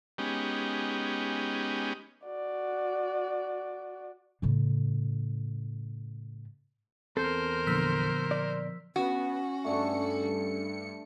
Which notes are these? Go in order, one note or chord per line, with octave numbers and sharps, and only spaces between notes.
G#3 B3 C#4 D#4 G4
F#4 D5
A2 C#3
E2 C4 A4 A#4 C5
A#2 D3 F3 B3 E6 B6
D5
B3 C#4 F#4
G2 A3 D4 A4 C#7